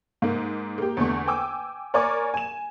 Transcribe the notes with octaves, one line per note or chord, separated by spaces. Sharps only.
G#2 A#3
A#3 G4
E2 D3 A3 C#6
G5 G#5 D6 E6
A#4 C#5 D5 G#5 C#6 D6
G#5 E7